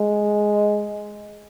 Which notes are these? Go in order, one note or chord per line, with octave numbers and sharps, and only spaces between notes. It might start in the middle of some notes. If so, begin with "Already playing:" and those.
Already playing: G#3